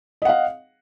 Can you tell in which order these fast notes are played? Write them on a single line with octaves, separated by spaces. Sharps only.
D#5 F#5 F5